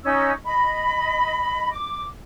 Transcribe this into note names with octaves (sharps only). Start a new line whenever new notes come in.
C#4 D#4 E6
D#5 B5
D6